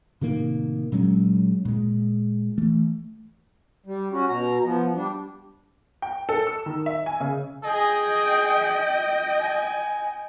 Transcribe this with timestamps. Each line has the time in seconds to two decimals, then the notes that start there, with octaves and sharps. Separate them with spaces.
0.21 A2 C3 D#3 A#3
0.92 A#2 F#3 G#3 C#4
1.65 A#2 G#3
2.58 E3 A3
3.86 G3
4.13 C#4 F#4
4.29 B2 A#5
4.64 F3 B3
4.95 G3 D4
6.02 G5
6.29 A4
6.47 E6
6.66 D#3
6.86 E5
7.06 G#5
7.20 C#3
7.64 G#4 D#5 G5
9.41 G#5